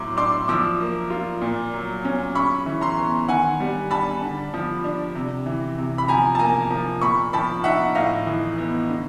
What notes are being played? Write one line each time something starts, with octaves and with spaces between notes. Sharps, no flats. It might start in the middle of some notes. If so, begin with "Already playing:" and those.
Already playing: A2 F#3 C6 D6
D4 C6 D6
F3 D6 E6
A#3
F4
A#2
F#3
C#4
C#3 B5 C#6
E3
A#5 C6
B3
D#3 F#5 G#5
G3
D4 A5 B5
D3
F3
D4
C3
E3
C3
B5
F3 G#5 A#5
A5
A#3 G#5 A#5
F3
A#2 B5 C#6
F3 A5 B5
D#4 E5 F#5
A2 D#5 F5
E3
B3
D3